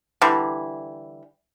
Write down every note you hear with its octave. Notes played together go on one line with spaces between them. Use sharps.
D3 E3 G3